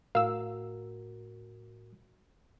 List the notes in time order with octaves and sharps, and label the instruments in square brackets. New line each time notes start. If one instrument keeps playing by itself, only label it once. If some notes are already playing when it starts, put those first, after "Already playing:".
[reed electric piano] A2 F#4 A#4 [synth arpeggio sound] F5 E6